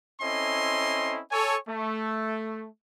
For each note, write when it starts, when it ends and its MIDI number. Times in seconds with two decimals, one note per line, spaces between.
0.21 1.20 60
0.21 1.20 61
0.21 1.20 64
0.21 1.20 69
0.21 1.20 75
0.21 1.20 84
1.31 1.56 69
1.31 1.56 73
1.31 1.56 80
1.69 2.67 57